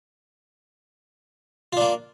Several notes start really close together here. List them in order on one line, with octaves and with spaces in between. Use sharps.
F4 D4 A#3